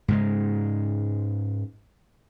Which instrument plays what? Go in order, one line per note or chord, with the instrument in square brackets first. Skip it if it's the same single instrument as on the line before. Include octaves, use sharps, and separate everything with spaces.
[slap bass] G#2 C#3 G#3